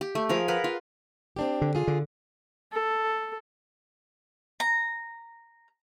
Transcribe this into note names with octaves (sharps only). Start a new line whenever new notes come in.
G4
A3
F3 G#4 A#4
A#4 B4 F#5
F4
C4 D4 G4
D3
F4 G#4
D3
A4
A#5